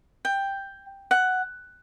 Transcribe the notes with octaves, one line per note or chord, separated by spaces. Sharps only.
G5
F#5